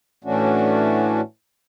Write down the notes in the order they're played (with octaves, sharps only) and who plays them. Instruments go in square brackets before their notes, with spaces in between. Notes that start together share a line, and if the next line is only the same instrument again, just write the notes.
[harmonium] A2 E3 A3 C#4 D4 F#4